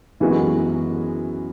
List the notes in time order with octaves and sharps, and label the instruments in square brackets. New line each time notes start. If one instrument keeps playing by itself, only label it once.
[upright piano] F#2 E3 G#3 B3 F#4